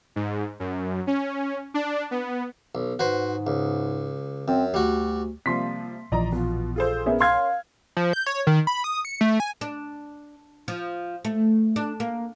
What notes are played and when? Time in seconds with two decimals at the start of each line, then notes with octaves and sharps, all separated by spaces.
0.16 G#2
0.60 F#2
1.07 C#4
1.74 D4
2.11 B3
2.75 B1
2.99 G#2 F#4 B4 C5
3.47 C#2
4.48 F#2 C4
4.74 D2 G3 F#4
5.46 C3 F3 G3 A#3 C6 B6
6.12 A#1 E3 F3 D5 D#5 A#5
6.32 B2 F4
6.76 F4 G#4 A4 C5
7.06 B3 C#4 G#4 A#4 E5
7.20 F5 C6 F6 G#6
7.97 F3
8.13 G6
8.27 C#5
8.47 D#3
8.67 B5
8.84 D#6
9.05 C#7
9.21 A3
9.40 G#5
9.61 D4
10.68 F3
11.25 A3
11.76 D4
12.00 A#3